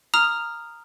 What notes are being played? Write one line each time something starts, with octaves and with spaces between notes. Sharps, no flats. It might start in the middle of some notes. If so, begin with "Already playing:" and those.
A#5 D#6 F6 F7